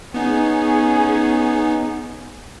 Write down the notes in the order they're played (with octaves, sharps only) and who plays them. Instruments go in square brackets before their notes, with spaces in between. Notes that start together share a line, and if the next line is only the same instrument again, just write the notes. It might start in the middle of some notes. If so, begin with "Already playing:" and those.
[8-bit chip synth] B3 D#4 [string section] C#4 G#4